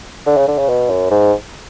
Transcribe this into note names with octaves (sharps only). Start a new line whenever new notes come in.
D3
C#3
D3
C#3
B2
F#2
G#2